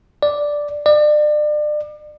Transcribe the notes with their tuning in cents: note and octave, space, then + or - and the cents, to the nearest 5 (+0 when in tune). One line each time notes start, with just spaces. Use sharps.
D5 +0
D5 +35